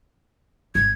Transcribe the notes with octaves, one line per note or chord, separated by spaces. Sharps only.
G#1 G#2 G#6